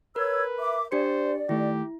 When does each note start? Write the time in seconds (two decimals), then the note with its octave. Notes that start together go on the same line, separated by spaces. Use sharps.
0.16 A#4 B4 C#5 E6 G#6
0.59 E5 D6
0.92 D4 G4 C5 D5 C#7
1.49 D#3 A3 E4 G4